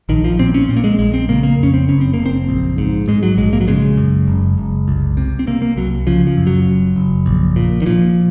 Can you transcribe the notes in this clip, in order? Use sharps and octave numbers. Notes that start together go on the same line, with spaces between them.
A#1 D#3
F3
A#2 C4
C#4
A#2 C4
A#3
G#3
A#1 G#3
C4
C#3 A#3
A#3
F2 C#4
C4
F#1 C#4
C4
F#1 A#3
C4
A#1
G#2
G#2 G#3
F#3
A#1 G#3
A#3
F#3
C#3 G#3
F#2
F#1
F#1
C2
C3
C4
C3 A#3
A#3
C2 F#3
C#3 F3
F3
F#2
F#3
F#1
F#1
A#1
A#2
D#3
A#2 F3